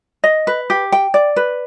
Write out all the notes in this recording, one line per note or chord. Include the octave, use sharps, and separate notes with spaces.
D#5
B4
G4
G5
D5
B4